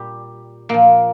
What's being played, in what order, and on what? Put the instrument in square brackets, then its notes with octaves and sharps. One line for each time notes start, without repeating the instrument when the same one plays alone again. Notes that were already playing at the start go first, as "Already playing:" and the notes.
Already playing: [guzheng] A#2 G3 G4
A#2 F3 A#3